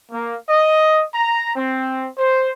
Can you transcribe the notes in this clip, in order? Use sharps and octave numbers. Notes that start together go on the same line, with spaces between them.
A#3
D#5
A#5
C4
C5